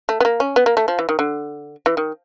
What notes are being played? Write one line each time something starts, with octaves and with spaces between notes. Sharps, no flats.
A3
B3
A#3
C#4
B3
A#3
A3
F3
E3
D#3
D3
E3
D#3